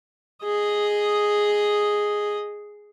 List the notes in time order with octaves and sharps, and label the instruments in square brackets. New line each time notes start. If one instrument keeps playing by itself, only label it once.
[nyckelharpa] G#4 D#5